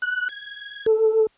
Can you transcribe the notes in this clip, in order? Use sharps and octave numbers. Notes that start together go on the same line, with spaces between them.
F#6
G#6
A4